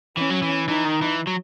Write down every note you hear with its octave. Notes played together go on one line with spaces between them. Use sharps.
E3 C#4
F#3
E3
E3 D#4
D#3
E3
F#3